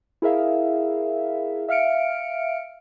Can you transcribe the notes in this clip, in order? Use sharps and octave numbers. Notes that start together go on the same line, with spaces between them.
E4 G#4 A#4 E5 F5
E5 F5 F6 C#7 D7